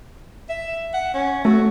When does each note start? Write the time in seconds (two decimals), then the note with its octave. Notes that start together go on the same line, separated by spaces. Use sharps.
0.50 E5
0.94 F#5
1.15 C#4
1.45 A3 F#4